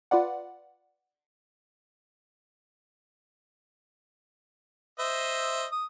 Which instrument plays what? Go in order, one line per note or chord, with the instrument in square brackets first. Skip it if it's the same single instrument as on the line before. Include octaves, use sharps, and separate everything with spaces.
[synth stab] F4 B4 D5 F#5
[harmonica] C5 D#5 E5
D#6